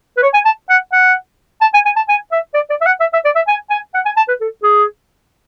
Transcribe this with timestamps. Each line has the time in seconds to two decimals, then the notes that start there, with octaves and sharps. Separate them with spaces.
0.17 B4
0.22 C#5
0.34 G#5
0.45 A5
0.69 F#5
0.92 F#5
1.61 A5
1.74 G#5
1.86 G#5
1.96 A5
2.09 G#5
2.32 E5
2.54 D5
2.70 D5
2.81 E5
2.86 F#5
3.00 E5
3.13 E5
3.25 D5
3.36 E5
3.48 G#5
3.70 G#5
3.94 F#5
4.06 G#5
4.17 A5
4.28 B4
4.41 A4
4.63 G#4